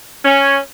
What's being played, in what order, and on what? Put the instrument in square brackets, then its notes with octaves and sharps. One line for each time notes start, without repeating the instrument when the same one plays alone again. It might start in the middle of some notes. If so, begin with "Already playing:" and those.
[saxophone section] C#4